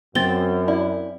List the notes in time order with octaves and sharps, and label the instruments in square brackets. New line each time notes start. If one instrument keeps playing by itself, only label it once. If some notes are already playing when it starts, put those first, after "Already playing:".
[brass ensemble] F#2 [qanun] C4 [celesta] A6 G7
[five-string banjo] E4 [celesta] D5